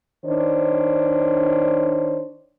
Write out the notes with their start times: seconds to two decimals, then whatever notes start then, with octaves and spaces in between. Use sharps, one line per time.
0.24 D#3 D4 C5 C#5